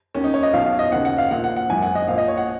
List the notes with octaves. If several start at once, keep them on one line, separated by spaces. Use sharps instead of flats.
D#2 D#3 C#4
D#4
C#5
D#5
B1 B2 F5
F5
D#5
D#2 C#3 F#5
F#5
F5
A#1 A#2 F#5
F#5
F#5
G#1 F#2 D#3 G#5
F#5
D#5
A#1 A#2 F5
D#5
C#5
F#5